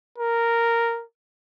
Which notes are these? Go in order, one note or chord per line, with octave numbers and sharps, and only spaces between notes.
A#4